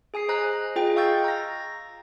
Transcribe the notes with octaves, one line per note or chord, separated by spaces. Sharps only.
G#4 G#5 D#6 C7
C5 D#5 A#5 F#6
F4 G#4 D#5 G5
F5 C#6 E6 G6 A6
A#5 A#6